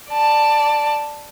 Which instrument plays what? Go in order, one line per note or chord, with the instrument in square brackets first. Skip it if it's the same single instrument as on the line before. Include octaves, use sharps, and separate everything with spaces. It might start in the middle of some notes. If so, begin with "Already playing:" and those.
[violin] D5 A5